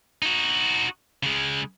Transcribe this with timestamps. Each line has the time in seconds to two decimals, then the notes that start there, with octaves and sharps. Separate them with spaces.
0.22 D#4 F#4
1.23 C#3 G#3